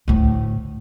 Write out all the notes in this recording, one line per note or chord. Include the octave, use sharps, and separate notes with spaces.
D2 A2